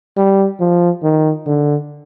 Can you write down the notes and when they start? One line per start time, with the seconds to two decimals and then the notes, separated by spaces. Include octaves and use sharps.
0.17 G3
0.60 F3
1.03 D#3
1.46 D3